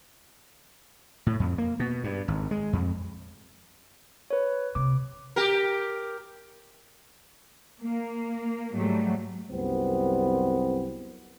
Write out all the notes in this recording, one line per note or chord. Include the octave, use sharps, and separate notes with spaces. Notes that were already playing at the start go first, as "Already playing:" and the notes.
A2
F2
A#3
B2
G2
G#1
G#3
F2
B4 C#5
C3 D6
G4 A#4
A#3
G#2 F#3 G3 A3
C2 F#2 B3 C4